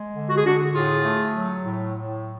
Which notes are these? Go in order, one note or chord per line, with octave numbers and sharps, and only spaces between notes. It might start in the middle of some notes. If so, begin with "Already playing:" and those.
Already playing: G#3
D3
F#4
G#4
D3 D4 F#4
A2 F4 G#4
A3
F#3
A2
A2